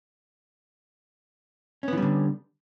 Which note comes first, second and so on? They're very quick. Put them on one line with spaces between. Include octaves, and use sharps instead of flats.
C#4 B3 E3 G3 D3